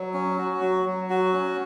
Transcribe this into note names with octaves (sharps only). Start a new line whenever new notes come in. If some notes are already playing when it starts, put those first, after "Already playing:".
Already playing: F#3
C#4
F#4
F#3
F#3
F#4
C#4